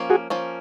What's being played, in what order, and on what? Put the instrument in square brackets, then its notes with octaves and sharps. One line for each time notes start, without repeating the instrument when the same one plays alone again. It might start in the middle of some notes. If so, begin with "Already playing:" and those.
Already playing: [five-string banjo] F3 A#3 C#4
[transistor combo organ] F#4 G#4
[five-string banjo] F3 A#3 C#4